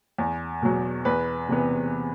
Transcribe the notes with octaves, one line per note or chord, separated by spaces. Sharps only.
E2
B2 F#3
E2 B4
C3 E3 B3